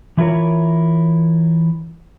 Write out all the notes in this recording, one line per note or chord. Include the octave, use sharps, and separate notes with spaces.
E3 E4 F4 A#4 C#5